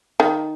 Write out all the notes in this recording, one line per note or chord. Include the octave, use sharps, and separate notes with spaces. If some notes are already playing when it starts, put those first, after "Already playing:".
D#3